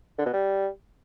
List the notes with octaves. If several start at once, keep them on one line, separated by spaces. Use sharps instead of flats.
D3
B2
G3